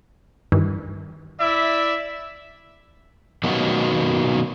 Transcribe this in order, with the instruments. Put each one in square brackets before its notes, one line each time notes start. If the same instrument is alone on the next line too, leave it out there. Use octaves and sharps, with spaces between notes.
[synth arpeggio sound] G2 D#3 E3
[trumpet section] E4 D5 E5
[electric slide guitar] B2 D#3 F#3 A#3 B3